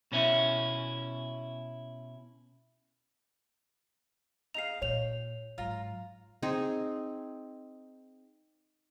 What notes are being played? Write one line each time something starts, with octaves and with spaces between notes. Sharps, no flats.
B2 C#4 E4
D#4 G#4 F5 C7 F7
A#2 C#5 G5 F7
G#2 F#3 F4 A#5
C4 D#4 G#4